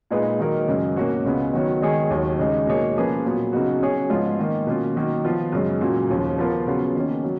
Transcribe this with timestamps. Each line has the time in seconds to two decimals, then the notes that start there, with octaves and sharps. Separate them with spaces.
0.11 A#2 G#3 D#4 G#4 B4
0.39 D#3 F#3 A#3 D#4 A#4
0.68 F#2 C#3 G#3
0.96 B2 A#3 C#4 F#4 C#5
1.25 C#2 C#3 G#3 B3
1.53 D#3 F#3 B3 F#4 C#5
1.82 D#3 G#3 D#4 G#4 C#5
2.10 D#2 D#3 F#3
2.39 C#3 G#3 D#4
2.67 B2 A#3 D#4 G#4 C#5
2.96 F3 A#3 C#4 G#4 B4
3.25 A#2 F#3 B3
3.53 C#3 F#3 B3 D#4 F#4
3.81 F#3 C#4 G#4 C#5
4.10 G#2 F3 G#3 B3 F4
4.39 D#3 A#3 D#4
4.67 B2 A#3 C#4 F4
4.96 D#3 F#3 A#3
5.25 F3 B3 F4
5.52 F#2 C#3 G#3
5.81 A#2 F#3 A#3 C#4
6.10 D#2 C#3 F3
6.38 F3 B3 F4 A#4
6.67 C#3 F#3 B3 F4
6.95 D#3 A#3 C#4
7.23 F#3